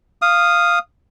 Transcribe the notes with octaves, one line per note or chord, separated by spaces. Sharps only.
F5 D#6